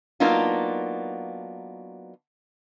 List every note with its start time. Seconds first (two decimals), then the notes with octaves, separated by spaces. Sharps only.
0.20 F#3 A#3 B3 D4 D#4 F4